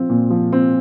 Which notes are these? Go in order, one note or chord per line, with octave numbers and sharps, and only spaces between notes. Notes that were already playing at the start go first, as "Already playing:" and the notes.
Already playing: F3 C4
A#2
F3
C4